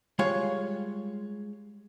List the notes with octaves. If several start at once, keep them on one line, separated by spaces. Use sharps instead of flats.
G3 G#3 F4 C#5 F5